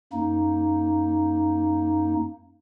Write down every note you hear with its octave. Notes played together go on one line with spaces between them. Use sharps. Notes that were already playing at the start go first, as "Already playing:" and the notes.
F#2 A#3 D#4